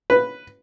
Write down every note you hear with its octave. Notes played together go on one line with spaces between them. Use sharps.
B4